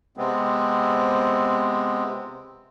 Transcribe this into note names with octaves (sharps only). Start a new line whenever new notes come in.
C3 G#3 B3 C4